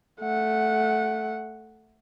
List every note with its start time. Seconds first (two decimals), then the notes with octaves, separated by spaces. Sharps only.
0.21 A3 F#5